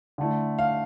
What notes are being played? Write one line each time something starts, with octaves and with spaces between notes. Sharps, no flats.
D3 A3 E4
F5